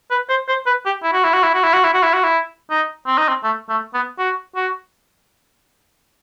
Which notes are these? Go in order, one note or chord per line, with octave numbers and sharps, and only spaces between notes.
B4
C5
C5
B4
G4
E4
F#4
E4
F#4
E4
F#4
E4
F#4
E4
F#4
E4
F#4
E4
D#4
C4
D#4
C4
A3
A3
B3
F#4
F#4